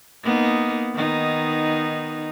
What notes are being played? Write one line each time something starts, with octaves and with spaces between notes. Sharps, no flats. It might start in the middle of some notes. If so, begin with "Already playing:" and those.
A#3 B3 D#4
D#3 B3 D#4